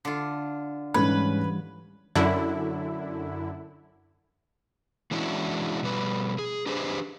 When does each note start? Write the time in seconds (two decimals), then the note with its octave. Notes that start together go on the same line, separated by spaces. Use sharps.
0.05 D3 F4
0.94 G#2 E3 G3 C#4 B4 G#6
2.15 F#2 D3 E4
5.11 E3 G#3 C#4 D4 E4 F#4
5.83 B2 G3 B4
6.39 G#4
6.66 D4 G4 G#4 B4 C5